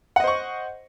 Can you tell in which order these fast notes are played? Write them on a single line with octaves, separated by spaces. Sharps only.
F#5 D#5 C5 C#6